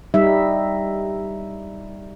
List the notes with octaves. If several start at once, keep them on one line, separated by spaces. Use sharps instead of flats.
G3 D#4 E5